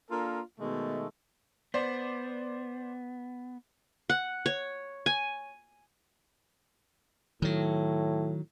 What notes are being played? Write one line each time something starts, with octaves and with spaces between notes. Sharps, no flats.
A#3 D4 F4 A4 A#4
B2 D#3 G#3 A3
B3 C5 D5
F#5
C#5
G#5
A2 D#3 F#3